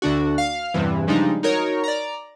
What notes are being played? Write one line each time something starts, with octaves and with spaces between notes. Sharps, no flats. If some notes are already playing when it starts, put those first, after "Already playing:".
D2 D3 D4 F#4
F5
E2 G2 C3 E3
C#3 F3 G3 G#3 D4 D#4
D#4 F#4 A#4 C#5
D5 A#5